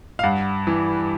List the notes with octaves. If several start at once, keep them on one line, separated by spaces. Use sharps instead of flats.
F5
G2 F#5
E3